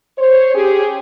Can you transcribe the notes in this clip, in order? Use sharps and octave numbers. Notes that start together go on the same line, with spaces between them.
C5 C#5
C#4 G4 G#4